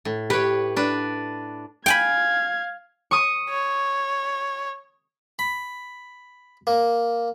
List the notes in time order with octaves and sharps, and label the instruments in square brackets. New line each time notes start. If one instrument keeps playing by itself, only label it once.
[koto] A2
[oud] G4 [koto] B4 C#5
[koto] D4 B4
[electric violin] F5 G#6 [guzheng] G5 G#5 B5
[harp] C#6 D#6
[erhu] C#5
[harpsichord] B5
A#3